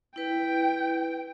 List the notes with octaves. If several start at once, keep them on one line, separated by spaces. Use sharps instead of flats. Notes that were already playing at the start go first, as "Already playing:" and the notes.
E4 B4 G5